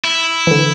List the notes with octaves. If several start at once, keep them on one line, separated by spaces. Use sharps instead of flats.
E4
E3
D3